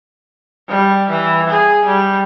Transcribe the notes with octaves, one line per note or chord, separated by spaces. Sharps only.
G3
E3
G#4
G3